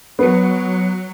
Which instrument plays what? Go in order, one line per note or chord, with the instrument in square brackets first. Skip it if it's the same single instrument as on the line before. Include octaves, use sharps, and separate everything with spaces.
[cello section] F#3 [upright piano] B3